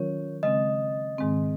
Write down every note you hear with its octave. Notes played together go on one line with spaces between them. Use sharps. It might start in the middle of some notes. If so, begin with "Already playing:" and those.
Already playing: D#3 F#3 C#4 F4 A#4 C#5
C#3 G#3 C4 D#5
G#2 D#3 G#3 C4